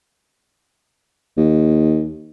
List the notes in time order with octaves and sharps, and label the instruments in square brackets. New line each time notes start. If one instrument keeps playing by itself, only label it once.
[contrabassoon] D#2